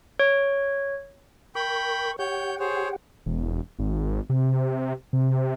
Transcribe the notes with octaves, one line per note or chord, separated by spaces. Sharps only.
C#5
A#4 G5 B5 C#6
G4 C#5 F#5 G5 G6
G#4 C5 C#5
E1
G#1
C3
C3